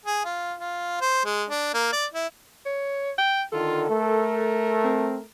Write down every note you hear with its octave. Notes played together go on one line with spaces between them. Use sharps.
G#4
F4
F4
C5
G#3
D4
A#3
D5
E4
C#5
G5
D3 D#3 F4 A4
A3 A#4
C4